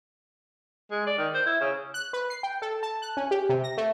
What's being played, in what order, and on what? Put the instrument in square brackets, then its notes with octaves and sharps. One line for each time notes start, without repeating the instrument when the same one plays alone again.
[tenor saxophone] G#3
D5
D#3
C5
E4
C#3
[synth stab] F#6
B4
C7
G5
A4
A5
F#6
C#4
G4
C3
A#6
A3